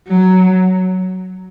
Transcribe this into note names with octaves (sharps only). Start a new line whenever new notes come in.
F#3